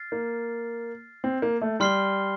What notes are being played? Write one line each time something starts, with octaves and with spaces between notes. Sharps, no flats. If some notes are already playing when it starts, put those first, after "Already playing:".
Already playing: F6 A6 C7
A#3
C4
A#3
A3
G3 C6 F6 C7 G7